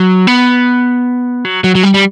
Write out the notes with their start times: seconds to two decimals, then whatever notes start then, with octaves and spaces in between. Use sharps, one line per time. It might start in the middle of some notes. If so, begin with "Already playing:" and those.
Already playing: F#3
0.27 B3
1.45 F#3
1.64 F#3
1.75 F#3
1.83 G3
1.94 G3